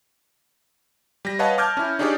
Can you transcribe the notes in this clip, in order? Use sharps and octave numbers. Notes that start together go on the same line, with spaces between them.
G3 A#6
B4 C#5 D#5 F5 F#5 A5
A5 D6 F6 G6 G#6
C#4 E4
D4 D#4 G4 G#4 C#5 D5